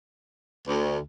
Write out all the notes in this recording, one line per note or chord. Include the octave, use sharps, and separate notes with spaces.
D2